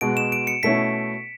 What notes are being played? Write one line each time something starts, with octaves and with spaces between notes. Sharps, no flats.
B2 G#3 B3 F#4 D7
E7
D7
C#7
B2 A3 C#4 E4 B6